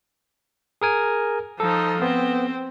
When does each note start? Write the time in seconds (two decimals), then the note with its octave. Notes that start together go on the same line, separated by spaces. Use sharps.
0.81 G#4 A#4 G#5
1.60 F3 D#4 A4
2.02 B3 C4